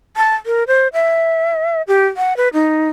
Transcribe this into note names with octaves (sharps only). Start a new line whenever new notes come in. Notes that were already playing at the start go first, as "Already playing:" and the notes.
A5
A#4
C5
E5
G4
F#5
B4
D#4